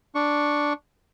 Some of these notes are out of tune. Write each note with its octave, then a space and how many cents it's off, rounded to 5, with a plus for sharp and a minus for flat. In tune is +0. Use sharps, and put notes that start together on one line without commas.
D4 +0 C#6 +0